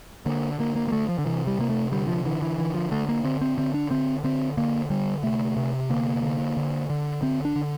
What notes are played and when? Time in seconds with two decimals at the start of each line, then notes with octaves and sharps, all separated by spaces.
0.26 D3 A#3
0.59 D3 A#3
0.76 A#3
0.88 A#3
0.92 D3 A3
1.09 F3
1.18 D3
1.25 C3 E3
1.47 G3
1.59 C3 A#3
1.70 A3
1.92 D3 G3
2.08 F3
2.25 D3 E3
2.42 E3
2.58 D3 E3
2.74 F3
2.91 D3 A3
3.09 A#3
3.24 D3 C4
3.41 C4
3.58 D3 C4
3.74 D4
3.91 D3 C4
4.24 D3 C4
4.57 D3 A#3
4.90 D3 G3
5.23 C3 A3
5.57 C3
5.90 D3 A#3
6.23 D3
6.57 D3
6.90 D3
7.22 D3 C4
7.45 D4
7.56 D3